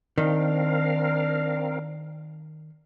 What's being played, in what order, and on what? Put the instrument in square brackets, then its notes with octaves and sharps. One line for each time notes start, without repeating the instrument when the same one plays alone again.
[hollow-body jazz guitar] D#3 [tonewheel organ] C4 A#4 F5 [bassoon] D4